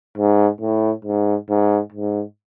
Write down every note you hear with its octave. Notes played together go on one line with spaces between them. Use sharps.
G#2
A2
G#2
G#2
G#2